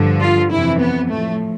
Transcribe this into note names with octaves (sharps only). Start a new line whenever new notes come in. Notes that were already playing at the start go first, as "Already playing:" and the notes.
Already playing: G2 D3 F3
F4
F2 C3 E3 E4
B3
A2 F3 A3